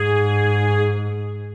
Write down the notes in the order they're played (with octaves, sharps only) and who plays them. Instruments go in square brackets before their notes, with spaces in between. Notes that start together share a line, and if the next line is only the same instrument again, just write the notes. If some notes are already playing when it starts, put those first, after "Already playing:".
Already playing: [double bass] G#2 [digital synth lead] G#4